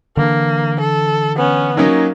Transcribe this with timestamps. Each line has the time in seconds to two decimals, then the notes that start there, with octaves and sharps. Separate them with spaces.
0.17 D3 E3 A#3 D4
0.80 A4
1.37 B3 C#4
1.77 F#3 A#3 C#4 D#4